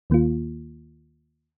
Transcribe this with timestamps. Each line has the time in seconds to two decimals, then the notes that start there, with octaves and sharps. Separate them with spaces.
0.10 D#2 D#3 A#3 F4